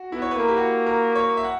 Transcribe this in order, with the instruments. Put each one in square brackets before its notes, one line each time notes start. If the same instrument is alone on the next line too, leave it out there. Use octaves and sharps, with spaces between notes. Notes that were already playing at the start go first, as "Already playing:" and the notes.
Already playing: [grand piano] F#4
[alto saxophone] B3 [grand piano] E4
[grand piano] C#5
B4
[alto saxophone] A#3 [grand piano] A#4
[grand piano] G4
F#4
A#4
C#5
E5
F#5